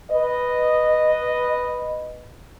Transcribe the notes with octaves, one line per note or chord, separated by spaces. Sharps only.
B4 D#5